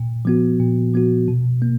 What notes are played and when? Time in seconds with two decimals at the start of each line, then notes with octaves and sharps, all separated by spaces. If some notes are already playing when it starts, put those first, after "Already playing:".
Already playing: A#2
0.25 F3 B3 F#4
0.60 A#2
0.94 F3 B3 F#4
1.28 B2
1.62 A#3